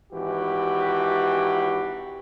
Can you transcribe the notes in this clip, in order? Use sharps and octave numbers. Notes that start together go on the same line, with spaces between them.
G#1 E3 F#4 G4